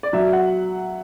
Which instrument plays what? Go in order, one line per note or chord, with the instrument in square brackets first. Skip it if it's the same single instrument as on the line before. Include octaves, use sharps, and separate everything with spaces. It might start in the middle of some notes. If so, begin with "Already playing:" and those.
[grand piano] D5
F#3 E5
F#5